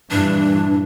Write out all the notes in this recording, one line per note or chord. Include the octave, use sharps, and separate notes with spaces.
G2 A#2 E3 D4